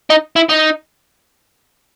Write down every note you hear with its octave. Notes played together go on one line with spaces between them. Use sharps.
D#4
E4
D#4